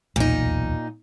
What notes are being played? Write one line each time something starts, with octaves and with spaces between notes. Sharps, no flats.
D#1 B1 E2 A#2 D#4